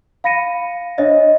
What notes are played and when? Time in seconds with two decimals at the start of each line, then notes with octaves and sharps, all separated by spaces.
0.24 F5 B5 A#6 C#7 D#7
0.98 D4 C5 C#5 D#5 E5